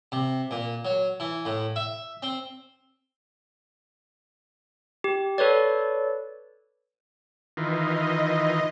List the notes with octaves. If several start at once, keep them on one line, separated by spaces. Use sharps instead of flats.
C3
A#2
F#3
E3
A2
E5
C4
G4
A4 B4 C#5 D5
D#3 E3 F4 D#5